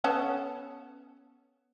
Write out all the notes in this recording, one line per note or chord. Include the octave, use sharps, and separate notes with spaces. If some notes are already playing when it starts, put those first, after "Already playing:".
B3 C#4 A4